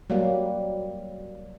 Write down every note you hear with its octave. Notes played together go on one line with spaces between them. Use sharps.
F#3 G3 A#3